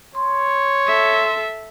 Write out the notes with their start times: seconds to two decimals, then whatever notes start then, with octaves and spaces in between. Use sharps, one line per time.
0.15 C#5 C6
0.87 A4 E5